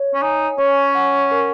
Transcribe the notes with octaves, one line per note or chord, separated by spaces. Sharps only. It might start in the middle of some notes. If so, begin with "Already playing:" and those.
Already playing: C#5
C#4
D#4 G#5
C#4 C#5
F#5
A#4